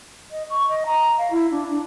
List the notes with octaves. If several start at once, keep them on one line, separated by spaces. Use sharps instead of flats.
D#5
C#6
D#5
A#5
F5
E4
D4
D4